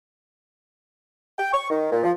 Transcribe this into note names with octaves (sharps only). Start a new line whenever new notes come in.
G5
C#6
D#3
A#2
F3